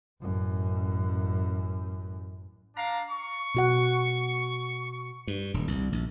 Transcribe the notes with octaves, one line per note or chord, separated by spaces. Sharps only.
A1 F#2
D4 F5 A#5
C#6
B2 F#4 F#5
G2
D#1
C2
A#1